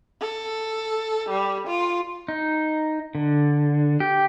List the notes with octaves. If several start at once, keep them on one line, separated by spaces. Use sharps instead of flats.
A4
G3
F4
D#4
D3
G4